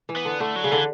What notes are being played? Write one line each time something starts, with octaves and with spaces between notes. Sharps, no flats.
E3
B3
D3
D3 A3
F#3
C#3
D3 E3